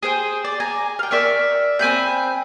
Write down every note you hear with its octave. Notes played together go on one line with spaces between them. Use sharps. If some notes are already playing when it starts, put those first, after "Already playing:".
G#4 C5 G5
D5
G#5 A#5
F5 G5
A#4 D5 E5 C#6
C4 G#5 B5 G6